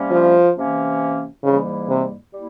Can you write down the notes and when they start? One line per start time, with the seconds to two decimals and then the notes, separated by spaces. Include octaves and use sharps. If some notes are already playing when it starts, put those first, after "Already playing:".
Already playing: C3 G3 A#3 C#4
0.11 F3
0.56 C3 E3 A#3 C#4
1.43 G#2 C#3 E3 G3 A#3 E4
1.89 C3
2.33 G3 A#3 E4